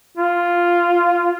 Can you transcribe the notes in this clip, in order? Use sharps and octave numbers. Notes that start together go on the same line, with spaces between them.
F4